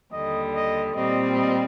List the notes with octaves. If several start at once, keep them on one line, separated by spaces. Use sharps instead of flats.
D#2 D3 G3 D#5
D#5
A#2 G3 C4 D#5
D#5